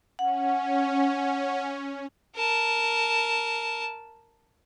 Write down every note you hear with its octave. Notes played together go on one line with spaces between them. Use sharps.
C#4 F#5
A#4 A5